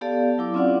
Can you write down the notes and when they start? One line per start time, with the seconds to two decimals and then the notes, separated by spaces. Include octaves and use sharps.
0.01 B3 G4 A4 D5 F5 A5
0.38 F#3 E4 D6
0.54 C4 C#4 F4 D5 F5 F#5